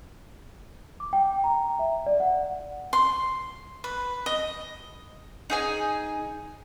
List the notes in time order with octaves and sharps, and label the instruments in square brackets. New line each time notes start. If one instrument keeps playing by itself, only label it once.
[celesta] D6
G5
A#5
E5
D5
F#5
[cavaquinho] C6
B4
D#5
[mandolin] D#4 G#4 G#5